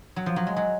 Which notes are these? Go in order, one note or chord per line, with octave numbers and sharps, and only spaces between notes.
F#3
F3
F#3
G#3
F#3